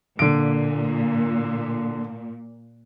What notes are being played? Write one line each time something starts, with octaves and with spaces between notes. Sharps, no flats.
A#2 D3 D7